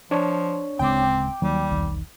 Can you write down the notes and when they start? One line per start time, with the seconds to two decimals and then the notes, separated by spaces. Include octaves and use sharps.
0.11 F3 D4 C#5
0.79 D1 C#3 G#3 C4 G5 D6
1.42 D#2 F#3 G3
1.70 E1 B1 D#3